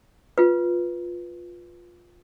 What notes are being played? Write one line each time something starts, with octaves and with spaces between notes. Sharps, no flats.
F4 B4